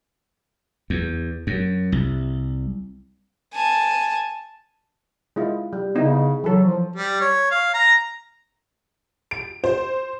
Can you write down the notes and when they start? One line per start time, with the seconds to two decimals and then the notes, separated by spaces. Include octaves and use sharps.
0.90 E2
1.47 F#2
1.92 C2
3.54 G#5 A5
5.36 G#3 E4 F4
5.73 G3
5.95 C#3 B3 D#4 E4
6.44 E3 F#3 A4
6.64 F3
6.96 G3
7.21 C#5
7.51 F5
7.73 A#5
9.31 D7
9.64 C5